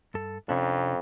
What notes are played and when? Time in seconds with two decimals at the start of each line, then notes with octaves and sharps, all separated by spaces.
0.14 G2 A4
0.49 F2 C3 C#4 D4